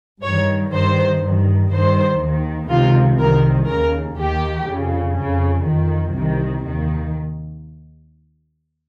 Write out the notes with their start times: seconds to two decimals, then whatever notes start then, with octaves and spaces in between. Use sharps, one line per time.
0.23 G2 D#3 C#5
0.72 G2 D#3 C5
1.22 G2 D#3
1.71 G2 D#3 C5
2.21 D#2 D#3
2.69 C#2 C3 D#3 F4
3.18 C2 C3 D#3 A#4
3.68 D#2 C#3 A#4
4.17 D#2 D#3 G4
4.67 F2 C#3
5.15 F2 C#3
5.65 F2 D#3
6.13 C2 C3 D#3
6.63 D#2 D#3